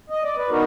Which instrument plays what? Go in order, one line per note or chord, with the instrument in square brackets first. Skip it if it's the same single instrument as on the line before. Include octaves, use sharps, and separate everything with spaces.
[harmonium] D#5
D5
B4
B3 D#4 F#4 A#4